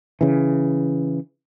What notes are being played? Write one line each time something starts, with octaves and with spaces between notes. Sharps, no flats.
C#3 E3